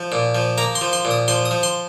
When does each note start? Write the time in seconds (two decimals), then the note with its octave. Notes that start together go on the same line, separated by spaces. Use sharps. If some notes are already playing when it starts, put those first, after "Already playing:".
Already playing: F3
0.12 A#2
0.35 F3
0.58 A#3 A#5
0.75 C6
0.81 F3
0.93 C6
1.05 A#2
1.11 D#6
1.28 F3 C6
1.45 D#6
1.51 F3
1.63 C6